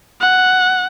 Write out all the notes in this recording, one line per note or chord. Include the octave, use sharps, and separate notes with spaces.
F#5